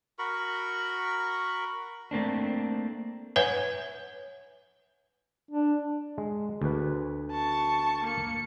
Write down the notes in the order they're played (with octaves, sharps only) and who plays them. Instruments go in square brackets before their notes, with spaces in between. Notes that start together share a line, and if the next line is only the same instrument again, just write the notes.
[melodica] F#4 A#4 B5 C#6
[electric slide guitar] A3 A#3 C4 D4
[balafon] B4 C#5 E5 F#5 G#5
[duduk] D4
[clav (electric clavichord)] G#3
D2 B4
[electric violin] A5 C#6
A#3 C#7